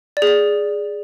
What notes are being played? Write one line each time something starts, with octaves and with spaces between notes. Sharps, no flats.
D5
G#4
D5